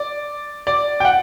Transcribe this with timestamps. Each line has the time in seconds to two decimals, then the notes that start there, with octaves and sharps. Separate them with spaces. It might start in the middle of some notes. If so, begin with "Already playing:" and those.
Already playing: D5
0.67 D5
1.00 G5
1.05 F#5